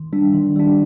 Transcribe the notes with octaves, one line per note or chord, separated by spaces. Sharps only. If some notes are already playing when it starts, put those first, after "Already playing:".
Already playing: D#3
G3 D4
D#3
G3 D4